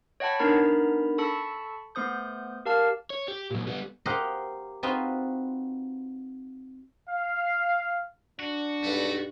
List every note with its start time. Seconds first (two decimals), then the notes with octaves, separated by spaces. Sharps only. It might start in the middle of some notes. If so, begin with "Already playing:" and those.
0.20 C#5 D#5 F#5 G5 A5 B5
0.39 B3 D4 D#4 A#4 A#5 B5
1.18 A4 A5 B5 C#6 E6 C#7
1.95 A3 B3 C5 D#6 G6
2.66 G4 A#4 F5 A5 F6
3.10 C#5
3.28 G4
3.51 A#2 F#3
3.67 G3 B3
4.06 G4 A#4 C5 D#5 F5 F#5
4.83 C4 D#4 F4 F#4 B4
7.08 F5
8.39 D4 F#4
8.83 B1 G2 A3